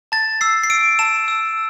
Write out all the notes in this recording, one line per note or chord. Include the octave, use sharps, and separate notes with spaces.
A5 A6
E6 C7
C7
E6 D7
A5 E7
E6